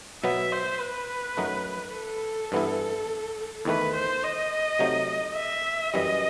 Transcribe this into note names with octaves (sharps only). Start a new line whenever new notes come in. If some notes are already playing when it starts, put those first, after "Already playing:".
B2 F#3 B3 E5
C5
B4
F#2 F#3 A3 D#4
A4
G2 E3 B3 E4
E2 D#3 A3 B4
C5
D#5
C3 F#3 A3 D#4
E5
F#2 E3 G3 D#5